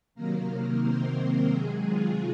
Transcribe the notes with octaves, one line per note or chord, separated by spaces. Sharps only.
C3 D#3 F#3 A#3 A#4
C4 C5
C3 D#3 F#3 G#3 G#4
F4